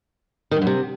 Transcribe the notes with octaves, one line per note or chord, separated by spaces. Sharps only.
D#3
G2
F#2
C3